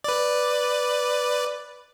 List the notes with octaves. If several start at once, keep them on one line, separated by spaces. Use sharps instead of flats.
B4 D5